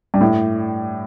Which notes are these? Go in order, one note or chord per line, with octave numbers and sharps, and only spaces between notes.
G2
A2